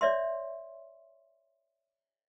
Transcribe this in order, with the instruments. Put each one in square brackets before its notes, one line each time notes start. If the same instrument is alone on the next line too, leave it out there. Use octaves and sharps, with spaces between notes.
[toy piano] C#5 D5 E5 C6